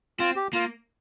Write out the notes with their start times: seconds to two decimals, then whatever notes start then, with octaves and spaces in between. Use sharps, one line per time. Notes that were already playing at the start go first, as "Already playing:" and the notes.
0.19 C4 F4
0.36 G4
0.53 A#3 F4